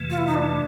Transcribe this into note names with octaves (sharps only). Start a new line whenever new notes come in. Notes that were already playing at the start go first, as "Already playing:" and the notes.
Already playing: F2 C3 E3 A3
F4
E4
D#4
D4